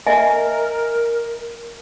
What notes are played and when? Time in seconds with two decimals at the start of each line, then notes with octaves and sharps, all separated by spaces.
0.07 A#4 D#5 E5 G#5